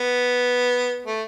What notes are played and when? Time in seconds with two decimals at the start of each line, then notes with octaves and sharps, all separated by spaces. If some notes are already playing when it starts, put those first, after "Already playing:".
Already playing: B3
1.06 A3